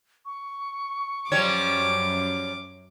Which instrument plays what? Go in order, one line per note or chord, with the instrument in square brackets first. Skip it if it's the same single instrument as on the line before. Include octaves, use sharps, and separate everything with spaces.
[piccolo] C#6
[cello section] F#2 [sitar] F3 G3 C#5 [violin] D6